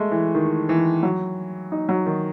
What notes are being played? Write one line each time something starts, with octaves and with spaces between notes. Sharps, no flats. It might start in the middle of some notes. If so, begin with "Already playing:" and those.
Already playing: G#3 A3
E3
D#3
E3
F#3
D#4
F#3
D#3